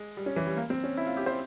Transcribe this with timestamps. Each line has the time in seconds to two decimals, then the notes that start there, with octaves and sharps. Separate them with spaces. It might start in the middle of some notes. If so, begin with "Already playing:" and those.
Already playing: G#3
0.17 G3
0.26 C#4
0.36 E3
0.47 G3
0.57 A#3
0.70 C4
0.84 C#4
0.97 E4
1.06 F4
1.17 G4
1.26 C5